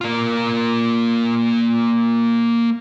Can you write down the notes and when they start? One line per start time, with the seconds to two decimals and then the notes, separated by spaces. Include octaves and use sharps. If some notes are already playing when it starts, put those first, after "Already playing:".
0.01 A#3 F4